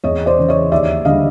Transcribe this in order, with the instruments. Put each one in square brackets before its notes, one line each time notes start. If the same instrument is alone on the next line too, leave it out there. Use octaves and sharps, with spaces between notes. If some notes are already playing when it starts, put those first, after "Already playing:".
[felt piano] E2 C#5 D#5
C5 D5
C#3 E3
C#5 D#5
D#2 D5 E5
D3 G3 D#5 F5